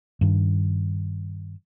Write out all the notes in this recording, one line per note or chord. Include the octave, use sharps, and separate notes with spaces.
G2 D#3